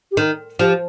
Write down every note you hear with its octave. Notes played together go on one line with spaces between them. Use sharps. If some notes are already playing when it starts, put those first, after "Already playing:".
G4
D#3 A#4
F3 G4